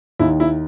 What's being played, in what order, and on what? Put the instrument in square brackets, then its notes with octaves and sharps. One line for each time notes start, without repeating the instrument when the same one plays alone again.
[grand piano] D#2 D#3 E4
E4